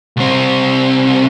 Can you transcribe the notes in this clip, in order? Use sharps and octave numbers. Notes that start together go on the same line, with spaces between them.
C2 C4